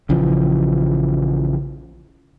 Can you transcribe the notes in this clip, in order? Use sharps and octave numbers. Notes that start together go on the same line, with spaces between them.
A#1 C#3 E3 F3